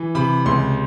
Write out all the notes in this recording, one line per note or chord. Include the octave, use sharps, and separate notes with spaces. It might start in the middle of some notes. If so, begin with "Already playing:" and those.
Already playing: E3
C3 B5
C#2 C6